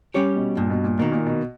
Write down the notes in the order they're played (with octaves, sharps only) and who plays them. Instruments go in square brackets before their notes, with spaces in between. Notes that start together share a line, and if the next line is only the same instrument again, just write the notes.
[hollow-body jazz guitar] G3 C#4 G4 C#5
[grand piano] B2
[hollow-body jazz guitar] G2 [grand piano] A#2
[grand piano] B2
A#2
[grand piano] B2 [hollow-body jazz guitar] D#3 A#3
[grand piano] A#2
B2